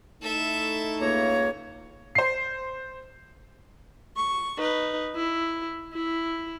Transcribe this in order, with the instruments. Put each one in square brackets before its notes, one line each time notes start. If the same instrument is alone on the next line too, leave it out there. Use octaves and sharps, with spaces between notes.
[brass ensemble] A3 D#4 E4 [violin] A4 E5
[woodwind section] C#2 A#3 C#5 [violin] A#5
[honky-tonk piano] C5 C7
[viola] C#6
D#4 B4
E4
E4